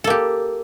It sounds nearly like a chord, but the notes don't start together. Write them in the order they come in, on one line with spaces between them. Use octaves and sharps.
A4 A#3 G4